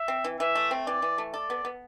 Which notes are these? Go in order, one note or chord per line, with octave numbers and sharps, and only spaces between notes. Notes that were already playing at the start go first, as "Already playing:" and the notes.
Already playing: E5
C4
E3
E3 E5
A3
C4
E3 D5
E3
A3
A4 D5
B3
B3